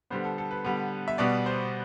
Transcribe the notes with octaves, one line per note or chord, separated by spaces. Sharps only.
D3 G3 B3 C5
A4
A4
B4
D3 G3 B3
E5
B2 G3 B3 D5
C5